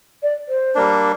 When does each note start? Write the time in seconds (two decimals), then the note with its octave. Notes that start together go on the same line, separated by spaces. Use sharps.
0.23 D5
0.48 C5
0.75 G3 A#3 D4